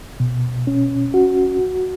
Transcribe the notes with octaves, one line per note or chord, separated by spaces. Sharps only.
B2
C#4
F#4